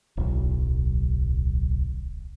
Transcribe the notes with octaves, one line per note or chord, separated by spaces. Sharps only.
D1 B1